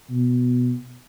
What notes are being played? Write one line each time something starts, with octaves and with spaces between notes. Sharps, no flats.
B2